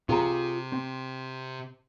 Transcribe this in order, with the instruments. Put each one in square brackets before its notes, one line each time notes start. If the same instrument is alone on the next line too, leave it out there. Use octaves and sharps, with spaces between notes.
[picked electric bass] C3 [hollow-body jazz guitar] F4 G#4 A#5
[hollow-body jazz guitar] C4